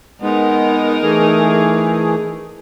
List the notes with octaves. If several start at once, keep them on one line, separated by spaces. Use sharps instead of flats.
G#3 B3 D#4 A#4
E3 A3 G#4